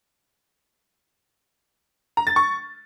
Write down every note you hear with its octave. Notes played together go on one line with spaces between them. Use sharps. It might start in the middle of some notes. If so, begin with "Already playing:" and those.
A#5
A6
C#6